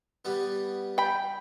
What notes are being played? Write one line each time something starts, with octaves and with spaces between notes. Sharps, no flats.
G3 B3
G5 B5